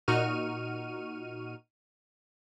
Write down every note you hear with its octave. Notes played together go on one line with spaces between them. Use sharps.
A#2 D#4 F#4 C#6 F6 D#7